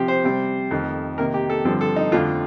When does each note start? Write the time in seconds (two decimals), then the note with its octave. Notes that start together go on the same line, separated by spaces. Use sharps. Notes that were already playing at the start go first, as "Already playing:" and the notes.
Already playing: C3 F3 C4 G4
0.08 C5
0.24 C3 G3 C4
0.71 F2 D#3 A3
1.18 C3 D#3 A#3 A#4
1.34 G4
1.50 A4
1.65 G2 D3 F3 C4 A4
1.81 A4
1.96 D#4
2.12 F2 D3 F3 A3 C4 F4